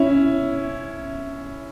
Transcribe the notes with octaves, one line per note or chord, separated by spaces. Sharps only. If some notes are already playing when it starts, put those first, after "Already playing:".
Already playing: C#4 E4